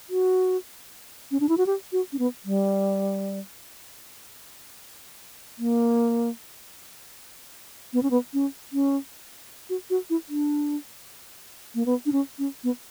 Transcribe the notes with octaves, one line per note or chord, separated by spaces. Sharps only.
F#4
C#4
D4
E4
F#4
G4
F#4
C#4
B3
G3
A#3
B3
C#4
B3
C#4
C#4
F#4
F#4
E4
D4
A#3
B3
D4
C#4
C#4
B3